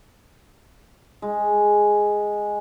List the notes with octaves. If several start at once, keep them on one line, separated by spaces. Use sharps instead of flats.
G#3